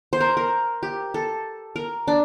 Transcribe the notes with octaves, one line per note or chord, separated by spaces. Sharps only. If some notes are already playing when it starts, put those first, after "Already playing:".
C5
A#4
A#4
G4
A4
A#4
D4